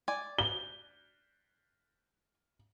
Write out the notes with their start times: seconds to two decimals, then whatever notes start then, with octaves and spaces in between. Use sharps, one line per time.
0.08 D5 G#5
0.39 G7